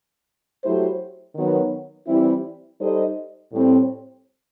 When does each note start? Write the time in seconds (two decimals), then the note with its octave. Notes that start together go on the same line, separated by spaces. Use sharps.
0.64 F#3 A3 E4 G4 C5
1.35 D#3 F#3 B3
2.08 E3 G3 C4 E4
2.80 G3 D#4 A4 C5 D#5
3.52 A2 G3 C4